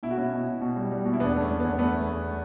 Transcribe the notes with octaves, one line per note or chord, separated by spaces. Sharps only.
B2 E4
F#4
B2 C#4 E4
B2
B2
B2
G3
G3
B2
E4
E2 B3 D4
A3 C#4
A3
E2 B3
A3 B3
A3
A3